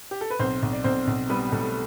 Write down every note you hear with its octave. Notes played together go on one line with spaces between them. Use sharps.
G4
A4
B4
B1 C4 C5
B1
D5
B1 C4 C5
B1
G3 B3 B4
B1 A3 A4